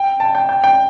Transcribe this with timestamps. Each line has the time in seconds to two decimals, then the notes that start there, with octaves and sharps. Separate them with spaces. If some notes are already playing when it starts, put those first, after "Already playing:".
Already playing: G5
0.20 A5
0.35 G5
0.49 G5
0.64 G5